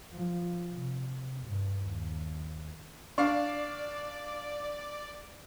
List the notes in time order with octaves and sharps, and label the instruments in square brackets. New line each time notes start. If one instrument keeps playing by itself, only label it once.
[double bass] F3
C3
G2
D#2
[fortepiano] D4 [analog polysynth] D5 [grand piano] F5 C#6